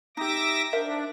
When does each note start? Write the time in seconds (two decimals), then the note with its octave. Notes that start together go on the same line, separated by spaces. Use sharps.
0.17 D#4 G4 E5 D6 A#6
0.73 D4 A#4 C5 E5